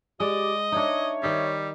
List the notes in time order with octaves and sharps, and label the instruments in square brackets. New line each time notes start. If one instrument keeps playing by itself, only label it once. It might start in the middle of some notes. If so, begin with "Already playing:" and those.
[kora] G#3 [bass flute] G4 [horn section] D5 [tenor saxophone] D#5
[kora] D4 D#4 [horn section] C#5 [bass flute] E5
[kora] D#3 D#4 [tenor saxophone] G3